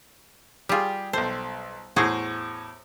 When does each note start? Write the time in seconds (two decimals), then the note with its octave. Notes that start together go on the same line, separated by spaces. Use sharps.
0.69 G3 F4 G4 G#4
1.13 B1 A4 C5
1.96 E2 A2 F#4 G#4 C5